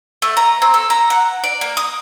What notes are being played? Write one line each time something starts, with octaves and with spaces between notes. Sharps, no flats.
A3
A#5
C4
A4
A#5
F#5
D5
A#3
D#6